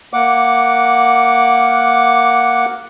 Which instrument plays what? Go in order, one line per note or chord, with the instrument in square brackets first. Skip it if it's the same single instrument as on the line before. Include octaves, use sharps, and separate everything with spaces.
[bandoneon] A#3 F#5 D6